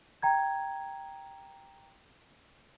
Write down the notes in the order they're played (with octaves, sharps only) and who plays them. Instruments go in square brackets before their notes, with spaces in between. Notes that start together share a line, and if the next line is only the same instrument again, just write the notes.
[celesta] G5 A#5 G#6